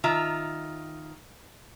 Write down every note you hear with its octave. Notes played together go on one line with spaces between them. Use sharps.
D#3 F4 E5 A#5